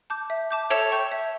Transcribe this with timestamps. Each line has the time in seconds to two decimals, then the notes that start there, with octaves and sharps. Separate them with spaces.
0.10 A5 D6 G6
0.30 E5
0.51 A5 D6 G6
0.70 A4 C#5 E5
0.92 G5 C#6 G6
1.12 E5